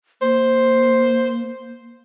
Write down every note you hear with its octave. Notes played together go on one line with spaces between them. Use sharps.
A#3 C5